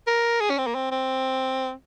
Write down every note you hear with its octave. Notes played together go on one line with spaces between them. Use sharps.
A#4
G#4
C#4
C4
A#3
C4
C4